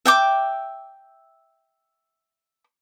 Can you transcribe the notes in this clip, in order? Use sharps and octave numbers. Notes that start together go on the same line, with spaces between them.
E5 G5 D6